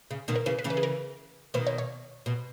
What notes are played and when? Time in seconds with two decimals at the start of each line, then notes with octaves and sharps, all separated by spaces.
0.11 C#3
0.28 B2 D#3
0.36 A#4
0.46 C#3 E3 B4
0.59 B4
0.64 C#3 E3
0.70 B4
0.77 G#4
0.83 A#4
1.54 B2 D#3 B4
1.67 C#5
1.78 C#5
2.26 B2